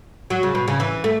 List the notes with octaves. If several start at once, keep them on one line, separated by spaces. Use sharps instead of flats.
F#3
C#3
B2
C#3
E3
A3